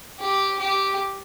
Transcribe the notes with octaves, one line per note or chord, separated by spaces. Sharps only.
G4
G4